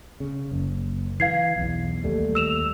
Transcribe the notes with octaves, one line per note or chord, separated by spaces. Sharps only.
C#3
F#1
E3 F5 G#6 C7
B1 E2
D#2 G3 A3
E6 E7 F7